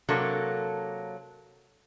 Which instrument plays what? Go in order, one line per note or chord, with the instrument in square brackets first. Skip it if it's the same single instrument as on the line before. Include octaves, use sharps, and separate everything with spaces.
[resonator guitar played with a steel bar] C3 F#3 A#3 D4 A4